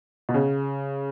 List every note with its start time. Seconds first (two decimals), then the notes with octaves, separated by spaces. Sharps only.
0.29 B2
0.34 C#3